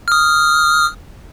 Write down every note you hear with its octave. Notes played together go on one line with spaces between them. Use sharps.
D#6 F6